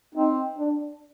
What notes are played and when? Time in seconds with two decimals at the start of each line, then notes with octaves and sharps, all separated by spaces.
0.14 C4 D#4
0.58 D4